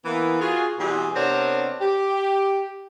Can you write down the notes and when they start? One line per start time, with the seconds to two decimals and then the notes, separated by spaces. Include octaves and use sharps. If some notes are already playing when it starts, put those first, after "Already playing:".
0.05 E3 A#3 B3
0.41 F4 F#4 G#4
0.78 B2 E3 G3 C4 G4 G#4
1.15 C3 B3 C4 D4 A#4 C#5
1.80 G4